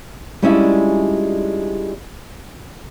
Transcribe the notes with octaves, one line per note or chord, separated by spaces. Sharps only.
G3 G#3 C#4 D4 E4 F4